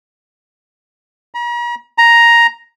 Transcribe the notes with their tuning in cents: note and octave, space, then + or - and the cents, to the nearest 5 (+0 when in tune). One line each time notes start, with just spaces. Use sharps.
A#5 +45
A#5 +5